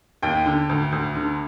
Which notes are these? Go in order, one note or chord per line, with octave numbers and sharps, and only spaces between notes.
D#2 G5
D3
D2
D2
D3